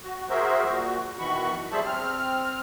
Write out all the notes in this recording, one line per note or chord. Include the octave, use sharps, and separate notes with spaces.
F#4
F#4 G#4 A#4 C5 E5
A#2 F#4
B2 D#3 E3 F#4 B5 C#6
G3 G#4 C5 E5 A5 B5
C4 F6